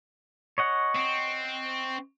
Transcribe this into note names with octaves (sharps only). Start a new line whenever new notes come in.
C#5 D#5 F#5
C4